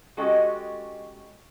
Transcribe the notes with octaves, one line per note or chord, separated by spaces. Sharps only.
G#3 C#4 F#4 G4 A4 D#5